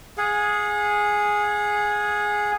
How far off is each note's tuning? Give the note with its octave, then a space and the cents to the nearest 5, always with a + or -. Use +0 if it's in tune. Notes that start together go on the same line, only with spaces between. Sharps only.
G#4 +0 F#5 -45